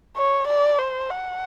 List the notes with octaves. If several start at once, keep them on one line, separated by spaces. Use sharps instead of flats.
C#5
D5
C5
F#5